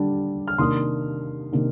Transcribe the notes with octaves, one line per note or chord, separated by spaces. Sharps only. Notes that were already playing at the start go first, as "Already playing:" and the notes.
Already playing: D3 G3 D4
F6
C3 D#3 A#3 D4 C6 D#6
C3 D#3 A#3 D4